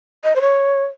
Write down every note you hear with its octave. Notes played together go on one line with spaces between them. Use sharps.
D#5
C5
C#5